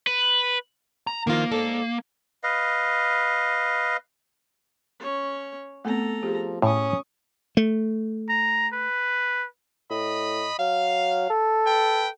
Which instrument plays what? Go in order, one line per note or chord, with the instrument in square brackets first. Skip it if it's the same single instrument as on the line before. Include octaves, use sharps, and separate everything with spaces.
[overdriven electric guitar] B4
[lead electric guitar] A#5
[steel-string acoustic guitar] D#3 F3 F4 [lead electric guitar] A#3
[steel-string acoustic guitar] G#2 A4 D5
[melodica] B4 D#5 F5
[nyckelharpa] C#4 C#5
[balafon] A3 B3 C4 [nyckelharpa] A4 A#5
[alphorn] F3 [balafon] G4 G#4
[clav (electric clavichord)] A2 [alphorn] C#4 [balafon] G#5 [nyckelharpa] C#6 D#6
[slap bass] A3
[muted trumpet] A#5
B4
[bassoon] A2 [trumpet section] D#5 B5
[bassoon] F#3 [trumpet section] F5
[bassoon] A4
[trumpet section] B4 G5